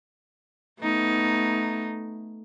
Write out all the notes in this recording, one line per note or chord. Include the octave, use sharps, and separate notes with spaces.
A3 B3 D#4